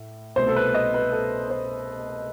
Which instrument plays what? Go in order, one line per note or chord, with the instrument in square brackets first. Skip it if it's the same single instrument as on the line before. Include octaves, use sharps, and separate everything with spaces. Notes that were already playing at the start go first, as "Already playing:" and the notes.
Already playing: [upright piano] A2
C2 B2 A3 C5
A4
B4
D#5
B4
A4
C5